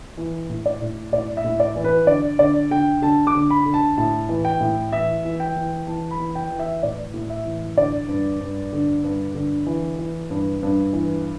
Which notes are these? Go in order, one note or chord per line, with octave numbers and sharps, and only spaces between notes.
E3
A2
D5
A2
A2 D5
E5
A2
D5
E3
B4
D3 D5
D3 D5
D3 G5
D3 A5
D6
D3
B5
D3
A5
A2 A5
E3
G5
A2
E3 E5
E3
G5
E3
E3 A5
B5
E3
G5
E3
E5
A2 D5
A2
E5
E3
D3 D5
G2
G2
D3
G2
D3
E3
E3
G2
G2
E3